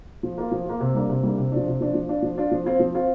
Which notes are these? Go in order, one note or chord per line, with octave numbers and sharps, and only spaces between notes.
F3
A#3 F4
F3
A#3 F4
C3
G3 A#3 D4
C3
G3 A#3 D4
C3
F3 D4
C3
F3 D4
F3
D4 F4
F3
D4 F4
F3
C4 F4
F3
C4 F4